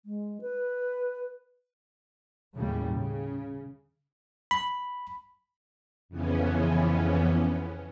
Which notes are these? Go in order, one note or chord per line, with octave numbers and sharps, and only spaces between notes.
G#3
B4
D#2 A2 C#3 G3
C#3
B5
F2 C#3 E3 B3 C#4